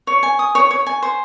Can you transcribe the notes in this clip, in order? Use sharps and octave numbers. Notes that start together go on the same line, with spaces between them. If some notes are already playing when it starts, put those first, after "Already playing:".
C#5
G#5
D#6
C#5
C#5
G#5
C5